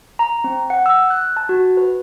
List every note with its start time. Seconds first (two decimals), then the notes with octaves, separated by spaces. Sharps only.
0.19 A#5
0.44 C4
0.70 F#5
0.86 E6
1.10 F#6
1.37 A5
1.49 F#4
1.77 B4